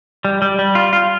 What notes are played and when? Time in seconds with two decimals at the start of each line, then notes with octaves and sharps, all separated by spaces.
0.25 G3
0.42 G3
0.59 G3
0.75 F4
0.93 F4